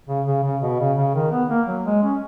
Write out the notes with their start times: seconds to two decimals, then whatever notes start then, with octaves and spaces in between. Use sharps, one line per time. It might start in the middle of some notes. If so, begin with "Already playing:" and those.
0.09 C#3
0.27 C#3
0.44 C#3
0.62 B2
0.80 C#3
0.97 C#3
1.14 D#3
1.32 B3
1.50 A#3
1.67 F#3
1.85 G#3
2.03 C#4